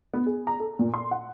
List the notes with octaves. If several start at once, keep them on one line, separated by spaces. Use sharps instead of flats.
B3
G#4
A#5
A4
A#2
C6
F#5